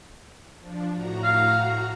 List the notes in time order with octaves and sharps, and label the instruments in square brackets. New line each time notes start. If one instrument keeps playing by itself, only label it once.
[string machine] F3 D4
A2 F#4 A#5
[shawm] F5